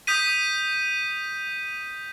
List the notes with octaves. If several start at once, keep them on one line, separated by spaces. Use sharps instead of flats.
D#6 G6 B6 D#7